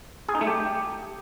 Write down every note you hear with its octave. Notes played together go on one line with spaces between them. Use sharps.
G#4
D#4
A3
G4